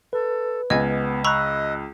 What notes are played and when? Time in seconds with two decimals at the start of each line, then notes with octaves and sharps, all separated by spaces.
0.13 A4 B4
0.70 C#2 B3 D#5 G#5 G#6
1.24 D#5 A#5 B5 C#6 E6 F#6